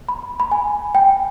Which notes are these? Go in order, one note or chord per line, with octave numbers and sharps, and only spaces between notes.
B5
B5
G#5
G5